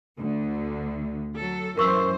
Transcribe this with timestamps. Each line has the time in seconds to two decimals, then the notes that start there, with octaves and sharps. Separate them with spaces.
0.19 D2 D3
1.35 F#3 A4
1.78 F#2 E3 A#4 C5 C#6 E6